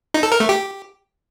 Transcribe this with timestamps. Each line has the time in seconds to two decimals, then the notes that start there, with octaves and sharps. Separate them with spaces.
0.14 D#4
0.23 A4
0.32 A#4
0.40 A3
0.49 G4